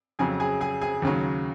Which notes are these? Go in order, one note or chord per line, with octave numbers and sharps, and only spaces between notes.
F2 C#3 F#3 G#4 G#5
G#4 G#5
G#4 G#5
G#4 G#5
D#2 C#3 F#3